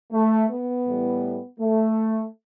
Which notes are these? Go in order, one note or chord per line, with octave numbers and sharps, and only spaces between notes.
A3
B3
A2 E3 G3
A3